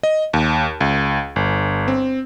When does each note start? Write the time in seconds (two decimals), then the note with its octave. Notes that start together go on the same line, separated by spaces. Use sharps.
0.03 D#5
0.34 D#2
0.81 C#2
1.36 G1
1.88 C4